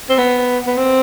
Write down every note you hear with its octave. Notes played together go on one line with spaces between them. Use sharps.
C4
B3
B3
C4